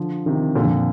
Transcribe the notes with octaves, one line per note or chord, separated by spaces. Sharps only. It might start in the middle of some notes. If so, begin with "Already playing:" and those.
Already playing: D3 F3
C3 D#3
A#2 D3
F2